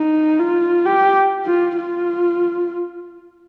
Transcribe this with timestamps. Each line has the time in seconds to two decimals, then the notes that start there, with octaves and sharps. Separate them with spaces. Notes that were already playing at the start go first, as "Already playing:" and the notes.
Already playing: D#4
0.39 F4
0.85 G4
1.45 F4
1.76 F4